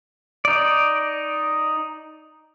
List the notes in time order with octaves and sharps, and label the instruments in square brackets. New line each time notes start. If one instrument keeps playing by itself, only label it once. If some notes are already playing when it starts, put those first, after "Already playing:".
[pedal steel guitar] D#4 D5